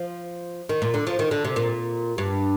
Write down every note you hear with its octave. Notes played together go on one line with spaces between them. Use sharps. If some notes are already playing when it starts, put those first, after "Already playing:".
Already playing: F3
D#3
A#2
D3
F3
D#3
D3
C3
A#2
G2